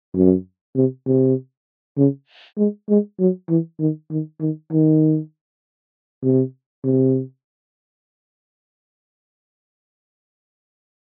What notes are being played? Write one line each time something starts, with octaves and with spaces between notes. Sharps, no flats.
F#2
C3
C3
C#3
G#3
G#3
F#3
E3
D#3
D#3
D#3
D#3
C3
C3